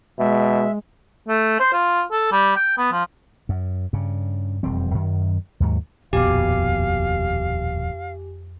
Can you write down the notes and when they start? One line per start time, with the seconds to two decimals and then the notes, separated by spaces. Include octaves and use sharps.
0.18 B2 G#3 E5
1.28 A3
1.60 C5
1.72 F4
2.12 A4
2.32 G3
2.56 G5
2.78 B3
2.92 F3
3.49 F#2
3.93 G2 C#3
4.63 E1 F2 G3 C4
4.94 F#2 D#3
5.60 D#2 G#2 F#3
6.13 D#1 A#1 F2 B2 G4 F5 G#5 D6